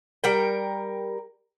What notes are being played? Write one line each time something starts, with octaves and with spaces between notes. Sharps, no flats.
G3 A#4 G5